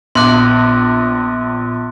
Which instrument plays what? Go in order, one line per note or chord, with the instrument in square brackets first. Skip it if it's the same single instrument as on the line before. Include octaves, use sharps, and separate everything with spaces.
[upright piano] A#1 [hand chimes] B3 D6 [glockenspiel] C6 F#6